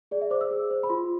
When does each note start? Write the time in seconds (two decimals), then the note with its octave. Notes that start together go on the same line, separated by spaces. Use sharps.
0.11 G#4 D5
0.21 E5
0.30 C5 D6
0.41 E6
0.51 G#4
0.71 C5
0.83 B5
0.90 F4 C6